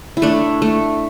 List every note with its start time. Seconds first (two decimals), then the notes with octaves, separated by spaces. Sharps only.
0.17 E4
0.22 A3 D4
0.62 A3